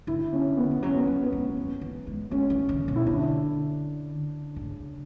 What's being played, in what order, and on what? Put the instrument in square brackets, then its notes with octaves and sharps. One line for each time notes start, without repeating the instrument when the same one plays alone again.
[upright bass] D3 [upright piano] E4
[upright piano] C#4
B3
[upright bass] E3
[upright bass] F#3 [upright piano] C#4
[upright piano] B3
[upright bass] F#3
[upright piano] B3
[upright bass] G#3
E3
E3
G#3
[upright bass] G#3 [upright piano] C#4
[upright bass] E3
D3
B2
[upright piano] E4
[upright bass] D3 [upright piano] D4
[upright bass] C#3